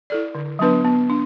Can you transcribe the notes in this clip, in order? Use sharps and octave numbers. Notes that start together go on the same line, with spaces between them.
E4 A4 D5
D3
F#3 B3 D4 B4
B3
D4